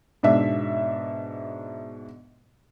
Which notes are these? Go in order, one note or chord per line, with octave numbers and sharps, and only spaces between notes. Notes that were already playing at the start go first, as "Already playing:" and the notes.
G#2 B2 D4 E5